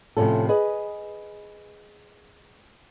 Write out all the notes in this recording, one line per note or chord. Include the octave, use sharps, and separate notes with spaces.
A2 C3 D#3 F3 C#4 A4
G#4 B4 D#5